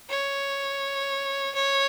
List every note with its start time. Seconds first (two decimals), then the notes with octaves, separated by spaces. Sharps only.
0.10 C#5
1.55 C#5